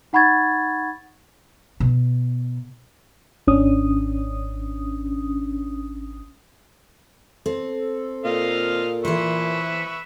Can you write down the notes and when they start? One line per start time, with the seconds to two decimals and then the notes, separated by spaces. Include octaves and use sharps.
0.13 D#4 F#5 B5 C#6 G#6 A6
1.80 B2
3.47 G#1 C#4 D4 D#6
7.46 C4 A4
8.25 A#2 F4 D#5 F5
9.05 E3 B4 C5 E5 C#6